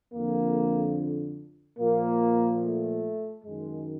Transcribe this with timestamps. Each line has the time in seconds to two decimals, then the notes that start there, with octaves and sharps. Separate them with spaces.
0.13 F2 D3 F3 A#3
1.79 A#2 F3 A#3
2.62 A3
3.45 F#2 D#3 G#3